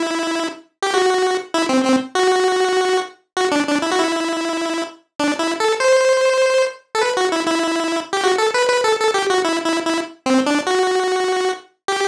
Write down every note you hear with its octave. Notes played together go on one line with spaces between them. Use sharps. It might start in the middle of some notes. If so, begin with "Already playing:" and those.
Already playing: E4
G4
F#4
E4
C4
C4
F#4
F#4
D4
D4
E4
F#4
E4
D4
E4
A4
C5
A4
B4
F#4
E4
E4
G4
F#4
A4
B4
B4
A4
A4
G4
F#4
E4
E4
E4
C4
D4
F#4
G4